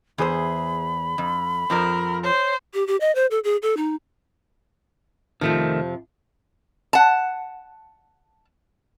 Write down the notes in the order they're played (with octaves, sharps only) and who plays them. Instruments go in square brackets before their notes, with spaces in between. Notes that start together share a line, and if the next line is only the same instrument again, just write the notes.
[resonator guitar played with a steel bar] E2 G#4 C5 [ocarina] B5
[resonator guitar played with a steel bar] F2
[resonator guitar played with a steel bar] F2 F3 C4 [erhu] A#4
[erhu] C5 [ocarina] C#5
[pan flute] G4
G4
D#5
C5
A4
G#4
A4
D#4
[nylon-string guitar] F2 C3 F3 [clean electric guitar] D#3 A3
[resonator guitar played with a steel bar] F#5 A5